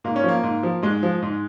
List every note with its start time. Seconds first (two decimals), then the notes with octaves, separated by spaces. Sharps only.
0.04 G#2 A#3
0.16 C#4
0.24 F3 A#3
0.43 G#2
0.63 F3
0.82 G#2 G#3
1.03 F3
1.22 G#2